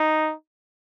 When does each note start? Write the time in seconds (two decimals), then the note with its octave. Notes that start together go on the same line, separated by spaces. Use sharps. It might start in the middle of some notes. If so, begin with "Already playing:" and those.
Already playing: D#4